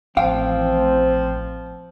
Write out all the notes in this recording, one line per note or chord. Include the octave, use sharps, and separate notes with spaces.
A1 F3 C4 F5 G5